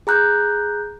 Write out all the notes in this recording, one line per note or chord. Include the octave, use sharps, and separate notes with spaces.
G#4 A#5 F#6 G6